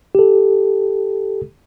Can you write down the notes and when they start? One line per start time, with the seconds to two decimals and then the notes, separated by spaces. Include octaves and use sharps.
0.15 G4 A4